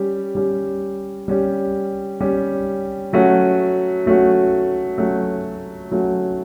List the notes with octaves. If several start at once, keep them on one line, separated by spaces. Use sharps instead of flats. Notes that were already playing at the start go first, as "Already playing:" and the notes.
Already playing: G3 C#4 G4
G3 C#4 G4
G3 C#4 G4
G3 C#4 G4
F#3 A3 C#4 F#4
F#3 A3 C#4 F#4
F#3 A3 C#4 F#4
F#3 A3 C#4 F#4